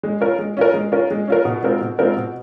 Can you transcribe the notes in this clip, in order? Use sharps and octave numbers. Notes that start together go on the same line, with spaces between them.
G#3
C#4 F4 A#4
G#3
C#4 F4 A#4
G#3
C#4 F4 A#4
G#3
C#4 F4 A#4
B2
G#3 C4 F4 A#4
B2
G#3 C4 F4 A#4
B2